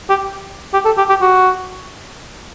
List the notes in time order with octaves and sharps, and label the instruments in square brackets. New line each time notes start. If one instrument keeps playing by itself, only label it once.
[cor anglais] G4
G4
A4
G4
G4
F#4